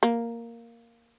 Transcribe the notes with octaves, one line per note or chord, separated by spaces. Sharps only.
A#3